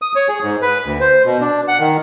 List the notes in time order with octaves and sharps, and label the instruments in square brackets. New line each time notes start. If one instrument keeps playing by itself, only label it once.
[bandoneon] D#6
C#5
G#4
G#2
B4
D2
C5
B2
D4
F#5
D#3